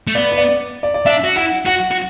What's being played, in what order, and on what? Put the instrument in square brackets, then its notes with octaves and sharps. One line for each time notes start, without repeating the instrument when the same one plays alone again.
[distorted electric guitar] A3
[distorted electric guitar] B3 [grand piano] D5
[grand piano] B4
D5
D5
D5
[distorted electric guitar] D4 [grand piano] E5
[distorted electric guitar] F#4
[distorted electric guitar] E4 [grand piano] F#5
[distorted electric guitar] F#4 [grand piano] F#5
[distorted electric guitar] F#4